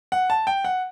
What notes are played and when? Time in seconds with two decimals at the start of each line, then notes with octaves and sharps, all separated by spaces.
0.12 F#5
0.30 A5
0.47 G5
0.65 F#5